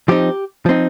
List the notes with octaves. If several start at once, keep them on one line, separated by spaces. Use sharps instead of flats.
F3 C4 D#4 G4
F3 C4 D#4